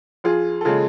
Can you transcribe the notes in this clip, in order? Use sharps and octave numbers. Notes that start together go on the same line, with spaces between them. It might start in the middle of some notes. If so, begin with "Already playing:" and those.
F2 F4 G#4
A4
C#3 G#3 F4 G#4